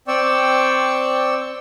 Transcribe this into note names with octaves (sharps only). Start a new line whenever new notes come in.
C4 D5 G5 C#6 E6